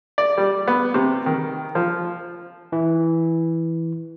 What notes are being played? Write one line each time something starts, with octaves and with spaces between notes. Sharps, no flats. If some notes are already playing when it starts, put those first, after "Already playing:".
D5
G3
B3
C3
D#3
F3
E3